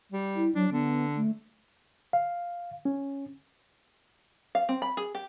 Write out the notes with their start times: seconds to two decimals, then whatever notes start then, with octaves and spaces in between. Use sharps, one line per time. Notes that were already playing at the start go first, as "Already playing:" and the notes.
0.12 G3
0.36 E4
0.55 F#3 D4
0.72 D3 B3
1.17 A3
2.13 F5
2.85 C#4
4.55 F5
4.69 C4
4.82 B5
4.97 G#4
5.15 G4